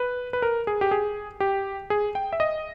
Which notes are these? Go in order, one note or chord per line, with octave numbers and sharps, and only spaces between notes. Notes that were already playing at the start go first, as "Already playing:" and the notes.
Already playing: B4
B4
A#4
G#4
G4
G#4
G4
G#4
G5
E5
D#5